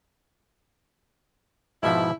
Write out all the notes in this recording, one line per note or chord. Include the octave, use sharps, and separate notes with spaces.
G#2 B2 F3 E4